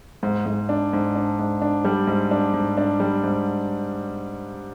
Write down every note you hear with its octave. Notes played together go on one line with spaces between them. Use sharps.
G#2
G#2
D4
G#2
D4
G#2
D4
G3
G#2
D4
G#2
D4
G3
G#2